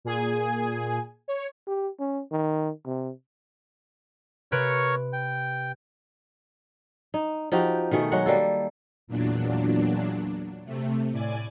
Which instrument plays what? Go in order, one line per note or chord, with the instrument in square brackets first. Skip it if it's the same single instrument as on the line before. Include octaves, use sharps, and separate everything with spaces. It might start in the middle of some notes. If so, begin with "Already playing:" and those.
[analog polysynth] A#2 G#4 G#5
C#5
[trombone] G4
C#4
D#3
C3
[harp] C3 B4 D7 [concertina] A#4 C#5 C#6
[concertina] G5
[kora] D#4
F3 D#4 F#4 G4
B2 D#3 A3 G#4
F#3 G#3 F#4 F#5
G3 A#3 A4
[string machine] E2 A#2 F#3 D4
C3 A3
A2 D5 G#5